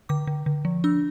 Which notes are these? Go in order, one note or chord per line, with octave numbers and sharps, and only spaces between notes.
D3 D6
D3
D3
F3
D4 E6